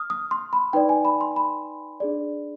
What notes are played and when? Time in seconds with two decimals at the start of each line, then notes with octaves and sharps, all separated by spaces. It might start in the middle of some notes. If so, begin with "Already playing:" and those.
Already playing: D#6 F6
0.10 D#6
0.31 C6
0.53 B5
0.73 D#4 B4 D5 G5
0.89 G#5
1.05 B5
1.21 C6
1.36 B5
2.00 D4 G#4 D5